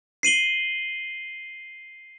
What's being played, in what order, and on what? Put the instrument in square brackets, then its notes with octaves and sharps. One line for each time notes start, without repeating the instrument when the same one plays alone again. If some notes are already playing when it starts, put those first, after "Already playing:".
[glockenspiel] C7 D#7 F#7 G7